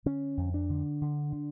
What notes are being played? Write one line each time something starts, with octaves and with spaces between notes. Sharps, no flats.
D3 C#4
F2
D4
D3
D3
D3